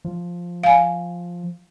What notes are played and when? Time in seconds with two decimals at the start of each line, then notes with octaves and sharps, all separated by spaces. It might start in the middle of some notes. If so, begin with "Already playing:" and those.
0.05 F3
0.63 F5 G#5